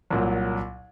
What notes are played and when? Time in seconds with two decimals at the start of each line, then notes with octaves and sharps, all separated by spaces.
0.10 C2 A#2 F#3